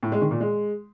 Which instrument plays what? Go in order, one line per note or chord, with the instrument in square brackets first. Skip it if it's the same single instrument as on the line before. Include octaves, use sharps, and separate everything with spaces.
[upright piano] A2
G#3
D#3
A#2
G#3